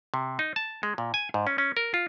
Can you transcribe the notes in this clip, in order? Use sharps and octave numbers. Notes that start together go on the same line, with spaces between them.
C3
D#4
A5
G#3
A#2
G#5
G#2
C#4
C#4
A#4
F4